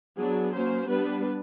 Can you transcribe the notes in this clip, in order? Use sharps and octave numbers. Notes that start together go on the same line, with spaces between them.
F#3 B3 D4 G#4
F#3 A#3 C#4 C5
G3 B3 D4 B4